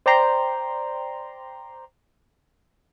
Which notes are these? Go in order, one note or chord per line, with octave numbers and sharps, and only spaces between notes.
C5 D5 G5 A#5 C6